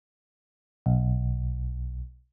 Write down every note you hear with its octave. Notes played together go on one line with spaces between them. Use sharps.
B1